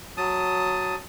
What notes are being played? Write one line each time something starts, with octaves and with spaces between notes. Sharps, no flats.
F#3 A5 D#6